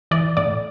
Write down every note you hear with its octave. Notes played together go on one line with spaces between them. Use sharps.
E3 D5
A2 D5